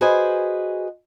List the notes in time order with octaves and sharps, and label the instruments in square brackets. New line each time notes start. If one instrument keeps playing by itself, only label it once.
[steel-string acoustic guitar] F#4 G#4 B4 C5 D#5 G#5